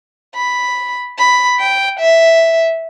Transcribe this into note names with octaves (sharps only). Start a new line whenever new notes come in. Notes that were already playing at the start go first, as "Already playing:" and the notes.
B5
B5
G5
E5